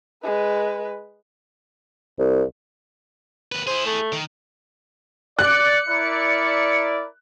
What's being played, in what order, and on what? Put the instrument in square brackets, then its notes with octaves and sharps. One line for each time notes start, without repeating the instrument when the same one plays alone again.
[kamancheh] G#3 B4
[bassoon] C2
[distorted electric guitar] D#2 B4
[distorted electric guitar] E4 G#4 [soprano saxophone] C5
[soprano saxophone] A3
[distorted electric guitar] D#3
[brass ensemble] D5 [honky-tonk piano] F#6 [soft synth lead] C#7
[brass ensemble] E4 A#4 D5